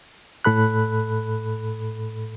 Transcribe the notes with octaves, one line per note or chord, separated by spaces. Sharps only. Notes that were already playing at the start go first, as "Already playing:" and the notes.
A2 A4 B5 F#6